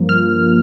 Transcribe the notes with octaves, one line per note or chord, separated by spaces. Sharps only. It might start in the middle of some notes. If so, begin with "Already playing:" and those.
Already playing: G2 F3 A#3
F6